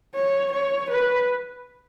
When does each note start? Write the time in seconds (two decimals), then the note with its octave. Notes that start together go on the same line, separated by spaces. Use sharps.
0.15 C#5
0.52 C#5
0.90 B4